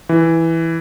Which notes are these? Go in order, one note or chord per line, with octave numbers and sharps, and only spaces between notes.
E3